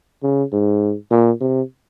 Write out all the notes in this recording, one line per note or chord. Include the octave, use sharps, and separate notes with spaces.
C#3
G#2
A#2
C3